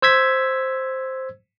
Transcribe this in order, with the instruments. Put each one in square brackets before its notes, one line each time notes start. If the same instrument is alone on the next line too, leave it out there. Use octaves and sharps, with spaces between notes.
[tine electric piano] C5 E6 G#6 B6